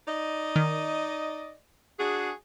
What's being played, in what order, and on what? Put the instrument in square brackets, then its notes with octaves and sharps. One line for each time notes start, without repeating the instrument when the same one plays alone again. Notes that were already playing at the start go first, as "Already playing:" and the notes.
[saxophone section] D#4 D5 D#5
[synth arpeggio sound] D#3
[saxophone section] D4 F#4 G#4